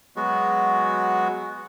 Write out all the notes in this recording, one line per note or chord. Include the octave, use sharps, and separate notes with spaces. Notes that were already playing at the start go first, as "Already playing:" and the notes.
F#3 G#3 B3 F#4